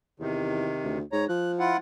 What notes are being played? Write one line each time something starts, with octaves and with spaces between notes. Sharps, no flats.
E2 C3 D#3
D2
G#2 C#5 A#5
F3 F#6
E4 F4 F#5